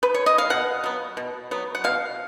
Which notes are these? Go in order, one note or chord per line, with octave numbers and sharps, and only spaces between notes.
B4
C#5
D#5
F5
B2 F#5
F#3 B3
B2
F#3 B3
F#5
B2 F5